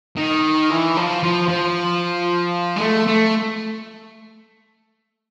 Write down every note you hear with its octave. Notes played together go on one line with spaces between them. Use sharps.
D#3
E3
F3
F3
F3
G#3
A3
A3